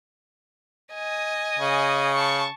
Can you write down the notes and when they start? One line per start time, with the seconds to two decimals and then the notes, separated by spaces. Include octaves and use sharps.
0.94 D#5 G#5
1.58 C#3
2.14 A5 C#6